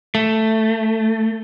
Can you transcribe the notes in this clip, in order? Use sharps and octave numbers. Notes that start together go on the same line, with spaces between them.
A3